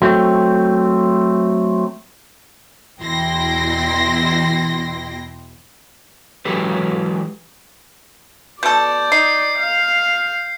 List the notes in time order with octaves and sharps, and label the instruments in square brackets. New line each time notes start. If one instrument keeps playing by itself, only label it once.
[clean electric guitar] F#3 A3 C4
[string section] E2 B2 E4 G5 C6 A#6
[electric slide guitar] E3 F#3 G#3 G4 A4 B4
[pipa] B2 A4 [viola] D5 [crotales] G6
[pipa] D#4 [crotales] C7
[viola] F5